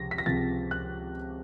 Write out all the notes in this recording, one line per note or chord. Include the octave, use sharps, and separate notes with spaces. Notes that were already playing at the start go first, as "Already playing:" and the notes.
Already playing: C#2 C3 F3 A#6
B6
A#6
C#2 C3 F3 A6
F#6